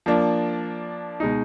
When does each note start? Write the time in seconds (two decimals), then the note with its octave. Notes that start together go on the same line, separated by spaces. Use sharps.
0.06 F3 A#3 D4
1.20 B2 G#3 D#4